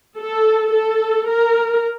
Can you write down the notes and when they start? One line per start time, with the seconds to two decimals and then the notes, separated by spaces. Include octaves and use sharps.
0.17 A4
0.72 A4
1.28 A#4